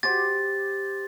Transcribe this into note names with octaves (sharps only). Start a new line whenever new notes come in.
G4 C5 D6 A6